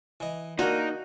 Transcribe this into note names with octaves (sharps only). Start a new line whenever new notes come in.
E3 D#5
A#3 D4 D#4 F4 F#4 A#4 G#5